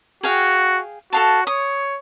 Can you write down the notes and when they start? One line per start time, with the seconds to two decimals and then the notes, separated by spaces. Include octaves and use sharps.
0.23 F#4 G#4 F5 G5
1.13 F#4 A4 F5 A5
1.47 C#5 D#6